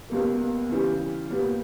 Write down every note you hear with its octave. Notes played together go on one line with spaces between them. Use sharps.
C#2 B2 G3 A#3
C#3 E3 G3
A#2 G3 B3